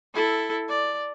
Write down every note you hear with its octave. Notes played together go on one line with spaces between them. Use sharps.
E4 A4
D5